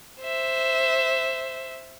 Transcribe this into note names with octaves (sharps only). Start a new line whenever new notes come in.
C5 E5